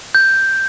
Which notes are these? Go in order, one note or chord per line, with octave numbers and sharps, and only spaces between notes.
G6